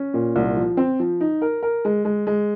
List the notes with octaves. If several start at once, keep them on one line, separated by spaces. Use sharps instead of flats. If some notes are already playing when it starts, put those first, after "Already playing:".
Already playing: C#4
A#2
C2
F3
C4
F3
D#4
A#4
A#4
G#3
G#3
G#3